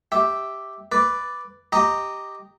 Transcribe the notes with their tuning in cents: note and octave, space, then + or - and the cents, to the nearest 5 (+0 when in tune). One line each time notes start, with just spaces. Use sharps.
G4 +0 E5 -10
B4 +5 D5 +0
G4 +0 D#5 +0 A#5 -10